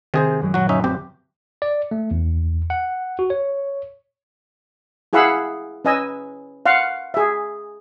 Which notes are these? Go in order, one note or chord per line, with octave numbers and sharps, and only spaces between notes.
C3 D#3 G#4 C5
G6
F#2 F#3 G#3
A#2 F#3 F#4
F#2 D3 A3 C#4 D#4 E5
B1 C4 G4
D5
A3
E2
F#5
F#4
C#5
E4 G#4 F5 F#5 B5 E6
C#4 B4 D#5 G#5 E6
F5 F#5 C6
G#4 E5